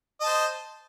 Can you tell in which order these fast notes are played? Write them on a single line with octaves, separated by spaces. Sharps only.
D#5 A5 C5